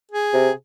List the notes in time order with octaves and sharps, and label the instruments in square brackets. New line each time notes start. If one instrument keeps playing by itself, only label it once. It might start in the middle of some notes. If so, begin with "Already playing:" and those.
[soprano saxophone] G#4
[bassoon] C3